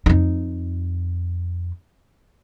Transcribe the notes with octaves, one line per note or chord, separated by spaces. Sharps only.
F2 D#4